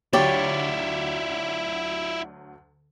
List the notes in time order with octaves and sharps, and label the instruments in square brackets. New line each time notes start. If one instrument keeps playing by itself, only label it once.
[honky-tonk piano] D2 F#3 [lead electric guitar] E4 F4 [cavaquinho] G4 D5 [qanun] C#5